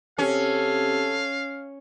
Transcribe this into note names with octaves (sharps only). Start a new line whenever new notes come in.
C3 C#4 A4 F5